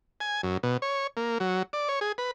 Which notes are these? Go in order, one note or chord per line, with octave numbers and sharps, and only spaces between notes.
G#5
F#2
B2
C#5
A#3
F#3
D5
C#5
G#4
B4